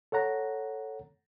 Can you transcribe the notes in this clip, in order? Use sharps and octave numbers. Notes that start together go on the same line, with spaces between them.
A4 C#5 F#5 A#5